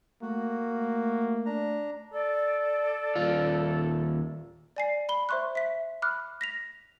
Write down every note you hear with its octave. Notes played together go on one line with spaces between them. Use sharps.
A3 A#3 F#4
D4 A#5
A4 D5
D#2 F4
D5 G#5 C7
B5 G7
C5 E5 C6 C#6 F#6
E5 B6
B5 D6 F6 F#6
A#6 B6 F7